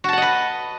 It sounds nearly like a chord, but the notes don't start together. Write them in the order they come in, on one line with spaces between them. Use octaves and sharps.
F#4 A5 F#5 D#5 B4